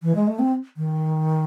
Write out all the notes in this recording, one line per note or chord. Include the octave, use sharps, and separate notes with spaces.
E3
G#3
A3
C4
D#3